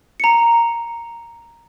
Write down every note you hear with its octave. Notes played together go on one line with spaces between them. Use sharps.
A#5 C#7